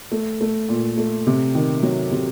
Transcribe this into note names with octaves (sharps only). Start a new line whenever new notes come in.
A3
A3
A#2
A3
C3
D#3
F#3
C3